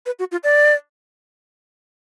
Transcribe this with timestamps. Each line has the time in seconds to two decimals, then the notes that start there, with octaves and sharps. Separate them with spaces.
0.06 B4
0.19 F#4
0.32 F4
0.44 D5